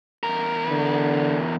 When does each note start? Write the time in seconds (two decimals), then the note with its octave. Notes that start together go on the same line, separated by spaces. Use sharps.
0.23 E2 A#4
0.69 D3